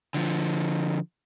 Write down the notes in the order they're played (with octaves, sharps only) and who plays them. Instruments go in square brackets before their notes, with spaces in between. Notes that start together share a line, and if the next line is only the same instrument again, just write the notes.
[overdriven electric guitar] D3 F3